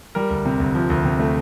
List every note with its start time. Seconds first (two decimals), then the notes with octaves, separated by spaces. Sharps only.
0.15 G3 A#4
0.30 D2
0.45 C3
0.60 D2
0.75 F3
0.90 D2
1.05 C3
1.19 A3